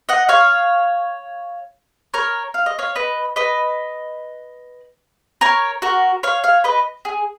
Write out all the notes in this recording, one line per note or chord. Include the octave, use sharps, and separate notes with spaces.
D#5 F#5
C#5 F5
A#4 C#5
F5
D#5
C#5 F5
B4 D#5
B4 D#5
A#4 C#5
F#4 A#4
C#5 F5
C#5 F5
B4 D#5
G#4